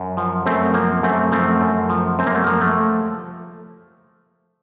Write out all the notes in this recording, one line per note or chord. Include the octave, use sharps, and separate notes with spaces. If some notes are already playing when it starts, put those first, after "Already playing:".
Already playing: F#2
F3
F#2 A3 C4
F3 A#3
F#2 A3 C4
F3 A3 C4
F#2
F3
F#2 C4
A#3
A3
F3 A#3
A3